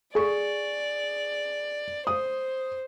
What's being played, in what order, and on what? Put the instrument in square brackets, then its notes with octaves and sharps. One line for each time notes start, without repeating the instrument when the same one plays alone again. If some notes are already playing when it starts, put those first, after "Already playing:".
[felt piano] G#4 C#6 [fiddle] D5
[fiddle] C5 [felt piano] D#6